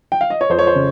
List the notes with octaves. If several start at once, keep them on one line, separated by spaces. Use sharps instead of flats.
G5
F5
D#5
C#5
F2 C5
C#5
C5
C#3